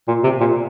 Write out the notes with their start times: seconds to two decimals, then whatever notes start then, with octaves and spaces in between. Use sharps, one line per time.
0.08 A#2
0.24 C3
0.41 A#2